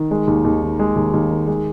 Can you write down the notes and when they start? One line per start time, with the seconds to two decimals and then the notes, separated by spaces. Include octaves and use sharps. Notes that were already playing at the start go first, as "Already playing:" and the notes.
Already playing: D#3
0.11 G#3
0.28 D#2
0.44 D#2
0.63 D#3
0.79 G#3
0.96 D#2
1.14 D#2
1.31 D#3
1.48 G#3